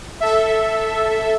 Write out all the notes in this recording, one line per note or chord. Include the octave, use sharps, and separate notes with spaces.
A4 E5